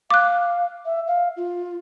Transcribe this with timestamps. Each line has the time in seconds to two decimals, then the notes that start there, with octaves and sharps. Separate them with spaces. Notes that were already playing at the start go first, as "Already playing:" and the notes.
0.10 F5 D6 F#6
0.85 E5
1.07 F5
1.37 F4